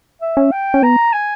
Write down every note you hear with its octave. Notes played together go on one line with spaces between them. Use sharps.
E5
C#4
G5
C#4
B3 A#5
G#5